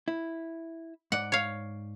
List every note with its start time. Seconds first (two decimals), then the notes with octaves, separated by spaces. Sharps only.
0.08 E4
1.12 G#2 D5 F#5
1.32 C#5 F5